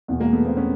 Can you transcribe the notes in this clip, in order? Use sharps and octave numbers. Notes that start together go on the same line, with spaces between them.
E2 B2
G#3 A#3
A3 B3
A#3 C4
B3 C#4